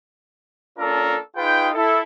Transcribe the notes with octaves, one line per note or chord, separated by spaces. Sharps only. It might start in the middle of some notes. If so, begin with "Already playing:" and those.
A#3 C#4 D4 F4 A4 A#4
D#4 F4 G#4 B4 G5
E4 A4